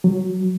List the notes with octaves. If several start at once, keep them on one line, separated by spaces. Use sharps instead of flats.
F#3